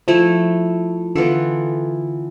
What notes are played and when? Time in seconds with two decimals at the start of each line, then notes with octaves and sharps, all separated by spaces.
0.08 F3 A3 E4 A4
1.15 D3 E3 B3 F4 A4